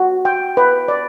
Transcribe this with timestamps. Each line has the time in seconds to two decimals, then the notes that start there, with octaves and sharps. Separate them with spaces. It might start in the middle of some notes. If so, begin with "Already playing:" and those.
Already playing: F#4
0.25 G5
0.57 B4
0.88 D5